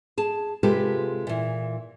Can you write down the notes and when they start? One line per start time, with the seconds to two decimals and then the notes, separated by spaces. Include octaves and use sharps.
0.17 G#4 A5
0.63 C3 G#3 F4 G4 A4 B4
1.27 A#2 E3